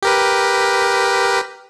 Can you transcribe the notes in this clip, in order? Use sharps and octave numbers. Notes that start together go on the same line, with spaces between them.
G4 A#4 B4